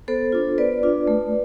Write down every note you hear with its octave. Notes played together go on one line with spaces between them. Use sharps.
B3 A4 C5
D4 F4
B3 B4 D5
D4 F4
A3